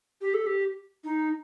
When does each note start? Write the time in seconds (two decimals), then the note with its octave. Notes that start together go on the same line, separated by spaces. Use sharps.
0.22 G4
0.34 A4
0.46 G4
1.04 D#4